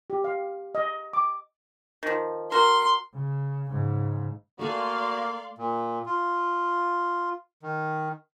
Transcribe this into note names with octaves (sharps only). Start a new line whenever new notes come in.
G4
F5
D#5
D6
D#3 F3
F#4 A#4 C6
C#3
G#2 C#3
A3 A#3 F#4 A4 D5 F5 G#5 C6
A#2
F4
D#3